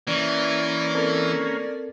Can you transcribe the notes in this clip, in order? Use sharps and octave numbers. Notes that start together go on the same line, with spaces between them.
E3 A#3 C#4 D5
C4 A4 A#4